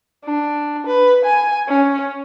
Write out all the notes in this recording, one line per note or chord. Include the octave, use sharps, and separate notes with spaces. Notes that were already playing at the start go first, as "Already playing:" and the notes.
D4
B4
G#5
C#4